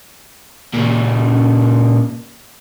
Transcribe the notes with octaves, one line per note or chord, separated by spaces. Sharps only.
A#2 C#3